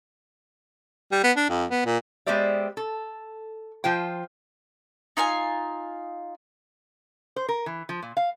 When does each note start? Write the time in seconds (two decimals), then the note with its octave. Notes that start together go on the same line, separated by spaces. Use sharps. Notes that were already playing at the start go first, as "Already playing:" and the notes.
1.12 G3
1.23 B3
1.37 D4
1.49 F2
1.71 B3
1.86 A#2
2.26 G#3 B3 G4 C5 D5 E5
2.77 A4
3.84 F3 F4 C5 G5
5.17 D#4 F4 F5 G#5
7.36 C5
7.49 A#4
7.66 E3
7.89 F3
8.02 A#2
8.17 F5